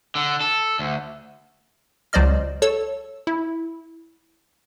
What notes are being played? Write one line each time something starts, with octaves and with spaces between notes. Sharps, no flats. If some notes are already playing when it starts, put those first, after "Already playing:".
D3
A4
D2
C#2 F#3 C5 D5 D#5 F6
A4 C#5 E6
E4